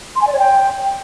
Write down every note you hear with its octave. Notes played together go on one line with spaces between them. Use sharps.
C6
G#5
D5
C#5
G5